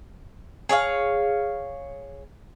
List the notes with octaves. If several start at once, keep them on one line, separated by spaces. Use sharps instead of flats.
G#4 C#5 D5 F5